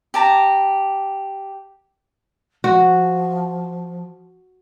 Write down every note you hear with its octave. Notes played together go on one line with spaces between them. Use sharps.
G4 A5 A#5
F3 F#4